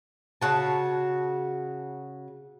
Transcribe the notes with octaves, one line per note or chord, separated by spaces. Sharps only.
C#3 F#4 A5